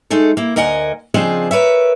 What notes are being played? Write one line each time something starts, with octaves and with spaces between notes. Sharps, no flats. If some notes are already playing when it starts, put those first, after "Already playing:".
G#3 A3 D#4 A4
A#3 E4
D2 A#4 D#5 F#5 G#5
C#3 F3 C4 D4 G#4 D#5
A#4 B4 C#5 E5